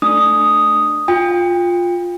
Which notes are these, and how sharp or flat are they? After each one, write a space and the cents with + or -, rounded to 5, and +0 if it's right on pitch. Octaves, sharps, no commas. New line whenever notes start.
A3 +0 D4 +15 D#6 +0
F4 +10 G5 +30